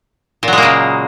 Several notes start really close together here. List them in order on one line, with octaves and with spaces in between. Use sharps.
A#2 F#3 G#3 A#3 C#3